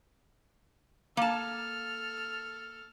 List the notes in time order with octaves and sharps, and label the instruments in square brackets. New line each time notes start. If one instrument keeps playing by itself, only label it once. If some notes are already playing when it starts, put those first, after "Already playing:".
[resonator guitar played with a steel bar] A#3 A5 [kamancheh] A4 F6